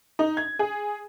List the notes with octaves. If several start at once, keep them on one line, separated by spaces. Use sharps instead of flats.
D#4
G#6
G#4